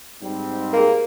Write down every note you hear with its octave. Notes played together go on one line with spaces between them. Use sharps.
G#2 G3 C4
A#3 G#4 A#4